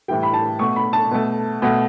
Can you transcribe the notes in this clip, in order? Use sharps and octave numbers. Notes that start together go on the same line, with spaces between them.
A2 E3 G3 G5
B5
A5
B2 A3 C#6
B5
A5
B2 A3
B2 A3